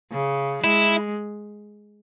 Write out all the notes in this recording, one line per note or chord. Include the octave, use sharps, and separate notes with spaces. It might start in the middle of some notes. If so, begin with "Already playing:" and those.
C#3
G#3 E4